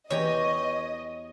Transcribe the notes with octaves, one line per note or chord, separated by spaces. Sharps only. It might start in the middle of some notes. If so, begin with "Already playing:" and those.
E2 G4 C#5 D#5 A#5